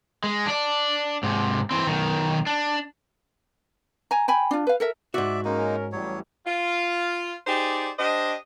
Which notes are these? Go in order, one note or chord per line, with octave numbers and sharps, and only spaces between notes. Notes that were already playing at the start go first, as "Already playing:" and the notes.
G#3
D4 D5
G#2 C3
E3 C4
B1 D#3
D4
G#5 A#5
G5 G#5 B5
D4 F4
B4 F5
A4 A#4 E5
G#2 F#4 D5 E5
G#3 A#3 C#4 D#4 A#4
A1 A2 F#3 G3 C#5
F4
D#4 G4 G#4 C5 D5
D4 G4 C5 D#5